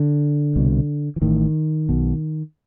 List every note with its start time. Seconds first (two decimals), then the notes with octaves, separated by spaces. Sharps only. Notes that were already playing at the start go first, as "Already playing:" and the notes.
Already playing: D3
0.56 C2 B2
1.16 E3
1.22 A1 A2 D#3
1.89 B1 B2